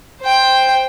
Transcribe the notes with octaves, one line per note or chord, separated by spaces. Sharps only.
C5 G5